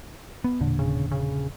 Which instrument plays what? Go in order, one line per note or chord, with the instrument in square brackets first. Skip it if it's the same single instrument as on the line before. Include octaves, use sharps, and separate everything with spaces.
[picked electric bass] B3
E1 A#2 D3
[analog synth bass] C#3
C#3